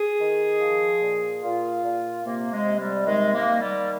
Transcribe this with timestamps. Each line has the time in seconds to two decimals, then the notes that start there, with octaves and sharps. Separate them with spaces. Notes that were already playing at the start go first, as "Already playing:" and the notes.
Already playing: G#4
0.20 D#3
0.61 F3
1.02 A#2
1.43 A#2 F4
1.84 A#2
2.25 C3 A#3
2.52 G#3
2.66 C3
2.80 G3
3.06 D#3 G#3
3.34 A#3
3.47 D#3
3.60 G3